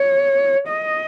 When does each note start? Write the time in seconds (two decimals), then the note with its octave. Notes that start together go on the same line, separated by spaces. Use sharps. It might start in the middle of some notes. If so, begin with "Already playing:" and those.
Already playing: C#5
0.68 D#5